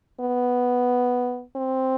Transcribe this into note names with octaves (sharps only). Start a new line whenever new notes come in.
B3
C4